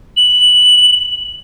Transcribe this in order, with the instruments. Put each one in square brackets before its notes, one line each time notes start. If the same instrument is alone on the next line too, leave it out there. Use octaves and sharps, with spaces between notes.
[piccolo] F#7